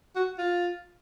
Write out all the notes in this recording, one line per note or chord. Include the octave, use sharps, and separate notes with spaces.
F#4
F4